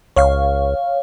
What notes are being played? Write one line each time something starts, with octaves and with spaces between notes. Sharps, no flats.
C#2 C#5 F5